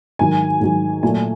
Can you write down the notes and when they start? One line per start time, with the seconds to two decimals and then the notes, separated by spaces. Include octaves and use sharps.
0.19 G#2 D#3 F#3 G#5
0.61 G#2 D#3 F#3
1.03 A#2 F#3 A3 G#5